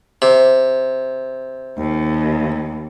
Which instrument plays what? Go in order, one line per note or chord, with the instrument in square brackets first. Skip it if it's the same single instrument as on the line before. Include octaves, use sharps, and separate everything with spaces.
[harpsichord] C3
[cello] D#2